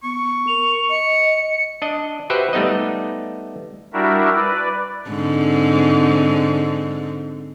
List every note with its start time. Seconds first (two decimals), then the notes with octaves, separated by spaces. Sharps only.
0.04 B3 C#6
0.48 A#4 F7
0.90 D#5 C#7
1.82 D4 D#5
2.30 F#4 G4 B4 C5 E5 F#5
2.53 G3 A3 B3 D#4 D#5
3.93 G3 D4 E4 F#4 A#4 E5
4.36 B4 D5
5.08 G#2 D3 C4